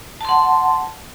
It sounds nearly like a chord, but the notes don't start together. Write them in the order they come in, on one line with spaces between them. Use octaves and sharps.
A5 C6 F#5